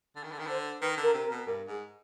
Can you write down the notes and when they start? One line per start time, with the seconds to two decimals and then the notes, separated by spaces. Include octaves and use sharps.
0.16 D3
0.23 D#3
0.32 D3
0.39 D#3
0.47 D3 C5
0.81 D#3 B4
0.97 D3
1.03 A#4
1.14 C3
1.24 A#4
1.30 B2
1.46 G2 A#4
1.67 G#2 G#4